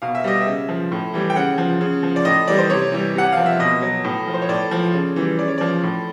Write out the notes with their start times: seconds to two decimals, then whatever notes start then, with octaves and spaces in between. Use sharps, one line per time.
0.02 B2 F5
0.15 E5
0.24 G3 D#5
0.41 E5
0.47 C#3
0.69 F3
0.92 A2
1.14 E3 G3
1.30 G5
1.36 C#3 F#5
1.58 F3
1.81 C#3
2.03 F3
2.16 D5
2.25 A2 D#5
2.48 E3 G3 D5
2.59 C5
2.70 C3 C#5
2.92 E3 G3
3.15 C3 F#5
3.32 F3 F5
3.46 E5
3.59 B2 D#5
3.82 F#3
4.04 A2
4.27 F3
4.34 C5
4.42 C#5
4.49 A2 D5
4.71 F3
4.94 C#3
5.16 E3 G3
5.39 C#3 D5
5.48 C#5
5.58 F3 D5
5.83 A2